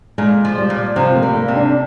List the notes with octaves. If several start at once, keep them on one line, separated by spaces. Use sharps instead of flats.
A#2 G#3
F3
G3
A#2
C3 F3
A#3
G3
A#3
C3
D4